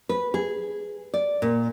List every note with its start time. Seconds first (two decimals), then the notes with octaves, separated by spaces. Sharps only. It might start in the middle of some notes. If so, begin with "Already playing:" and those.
0.09 B4
0.34 G#4
1.14 D5
1.42 A#2